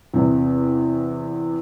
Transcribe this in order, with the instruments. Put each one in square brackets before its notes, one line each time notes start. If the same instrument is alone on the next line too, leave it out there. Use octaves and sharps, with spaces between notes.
[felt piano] E2 C3